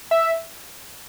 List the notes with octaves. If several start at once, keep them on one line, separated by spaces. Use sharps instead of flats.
E5